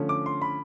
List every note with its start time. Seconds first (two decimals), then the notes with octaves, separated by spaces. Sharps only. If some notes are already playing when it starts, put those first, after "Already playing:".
Already playing: D3 F3 A3 C#4
0.09 D6
0.26 C6
0.42 B5